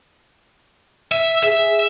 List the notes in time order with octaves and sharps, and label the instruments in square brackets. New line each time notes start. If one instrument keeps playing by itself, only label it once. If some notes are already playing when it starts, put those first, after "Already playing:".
[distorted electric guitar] E5
[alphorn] G#4 [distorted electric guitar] E5